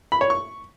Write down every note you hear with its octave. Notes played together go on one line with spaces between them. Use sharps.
B5
C#5
C#6